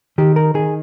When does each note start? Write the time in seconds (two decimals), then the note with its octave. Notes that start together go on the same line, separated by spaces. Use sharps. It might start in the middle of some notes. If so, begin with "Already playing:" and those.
0.18 D#3 G4
0.36 A#4
0.54 D#3 G#4